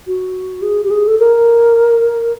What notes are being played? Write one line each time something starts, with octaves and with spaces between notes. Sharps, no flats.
F#4
G#4
G4
G#4
A4
A#4